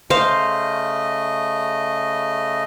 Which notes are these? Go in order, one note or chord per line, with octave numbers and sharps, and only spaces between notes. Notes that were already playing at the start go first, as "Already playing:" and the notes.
C#3 A3 C5 D#5 F5